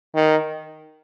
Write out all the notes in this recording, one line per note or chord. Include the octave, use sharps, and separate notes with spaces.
D#3